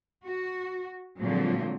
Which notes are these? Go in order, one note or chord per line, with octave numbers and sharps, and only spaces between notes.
F#4
A#2 D3 F3 F#3 G#3 C4